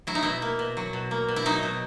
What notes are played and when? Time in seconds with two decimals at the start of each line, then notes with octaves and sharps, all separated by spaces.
0.07 F#3 E4
0.15 D#4
0.22 B2 E4
0.42 A#3
0.59 B2
0.77 F#3
0.93 B2
1.11 A#3
1.28 B2
1.36 E4
1.45 F#3 D#4
1.63 B2